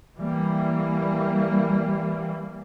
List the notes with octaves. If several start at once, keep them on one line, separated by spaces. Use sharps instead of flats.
E3 G3 A#3